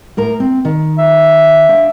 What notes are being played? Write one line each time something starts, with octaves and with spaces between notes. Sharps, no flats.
A2 A#4 A#5
C4
D#3
E5
D4 F5